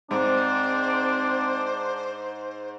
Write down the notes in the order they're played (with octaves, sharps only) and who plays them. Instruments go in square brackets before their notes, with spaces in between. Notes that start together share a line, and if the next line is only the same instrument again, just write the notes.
[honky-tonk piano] G#2 [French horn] C4 [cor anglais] D4 [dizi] C5